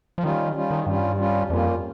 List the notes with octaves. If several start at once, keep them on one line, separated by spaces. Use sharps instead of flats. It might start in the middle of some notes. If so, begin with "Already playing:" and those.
F3
D#3 G3 C#4 F4
G3 C#4 F4
D#3
G2 G3 C#4 F4
G3 C#4 F4
F2 G3 A#3 C#4 F4